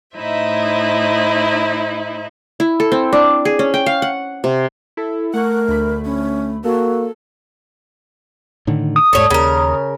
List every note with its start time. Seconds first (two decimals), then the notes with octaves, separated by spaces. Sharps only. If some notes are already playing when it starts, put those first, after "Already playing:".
0.16 A2 D#4 E4 C5 E5
2.60 E4
2.80 A4
2.92 C4
3.13 D4
3.45 G#4
3.59 C#4
3.74 G5
3.86 F5
4.02 F#5
4.44 C3
4.97 E4 A4
5.34 A3 A#4 F#5 C#6
5.68 D2 B5
6.05 C#4
6.65 A#3 F#4 A4
8.67 A2 D3 D#3
8.96 D#6
9.13 D#1 G#2 A3 C#5
9.30 D#2 C#3 A#4